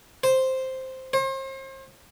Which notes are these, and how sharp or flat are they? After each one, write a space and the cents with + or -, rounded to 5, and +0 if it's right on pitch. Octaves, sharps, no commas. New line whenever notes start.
C5 +0
C5 +40